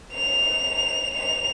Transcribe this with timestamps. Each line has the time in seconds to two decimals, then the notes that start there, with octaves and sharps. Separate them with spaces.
0.13 F7
1.14 F7